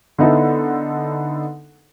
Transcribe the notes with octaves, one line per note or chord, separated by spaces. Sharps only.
D3 B3 D#4 E4 A4